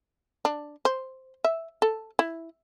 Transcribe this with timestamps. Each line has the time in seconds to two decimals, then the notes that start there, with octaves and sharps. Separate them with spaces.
0.45 D4
0.85 C5
1.44 E5
1.82 A4
2.19 E4